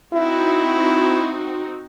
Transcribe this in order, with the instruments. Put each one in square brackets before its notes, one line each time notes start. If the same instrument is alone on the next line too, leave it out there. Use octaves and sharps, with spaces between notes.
[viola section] C4 D#4 F#4 [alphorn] E4